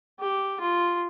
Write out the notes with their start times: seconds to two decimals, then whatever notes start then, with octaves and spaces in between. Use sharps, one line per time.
0.20 G4
0.60 F4